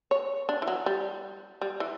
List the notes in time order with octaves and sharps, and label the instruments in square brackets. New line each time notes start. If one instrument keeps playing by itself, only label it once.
[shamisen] C#5
D4
E3
F#3
G3
G3
E3